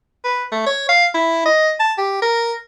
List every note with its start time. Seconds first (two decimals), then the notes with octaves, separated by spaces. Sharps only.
0.24 B4
0.52 A3
0.67 C#5
0.89 F5
1.14 E4
1.46 D#5
1.80 A5
1.98 G4
2.22 A#4